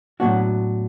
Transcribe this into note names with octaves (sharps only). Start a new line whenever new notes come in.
A2 F#3 B3 D4 F#4